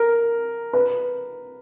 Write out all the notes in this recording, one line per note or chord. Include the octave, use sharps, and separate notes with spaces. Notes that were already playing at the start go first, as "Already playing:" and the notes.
Already playing: A#4
B4